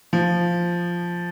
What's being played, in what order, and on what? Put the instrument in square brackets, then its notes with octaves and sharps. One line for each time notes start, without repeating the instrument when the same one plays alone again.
[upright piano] F3